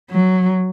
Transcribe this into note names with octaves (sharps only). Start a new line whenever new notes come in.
F#3